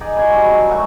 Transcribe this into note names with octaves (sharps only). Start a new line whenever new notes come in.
D#4 G#4 D5
F#4 G#5 B5
G#2 G3 A3
F#3 C#4
F#2 A3 F#4 C#6